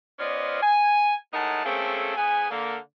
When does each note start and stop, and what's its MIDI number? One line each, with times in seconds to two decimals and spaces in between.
0.19 0.60 59
0.19 0.60 61
0.19 0.60 65
0.19 0.60 72
0.19 0.60 74
0.19 0.60 75
0.62 1.14 80
1.33 1.63 45
1.33 1.63 56
1.33 1.63 63
1.33 1.63 70
1.33 1.63 78
1.33 1.63 81
1.65 2.15 57
1.65 2.15 58
1.65 2.15 60
1.65 2.15 61
1.65 2.15 68
1.65 2.15 69
2.16 2.48 44
2.16 2.48 59
2.16 2.48 68
2.16 2.48 80
2.50 2.77 50
2.50 2.77 58